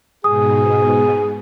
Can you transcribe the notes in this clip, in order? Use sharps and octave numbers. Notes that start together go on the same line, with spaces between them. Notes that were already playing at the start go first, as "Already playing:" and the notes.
G#2 B2 G#4 D#6